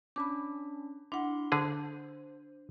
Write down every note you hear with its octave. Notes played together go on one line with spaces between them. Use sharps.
C#4 D4 B5 D6
D4 E4 E5 F#5 C6
D3 G#4 C5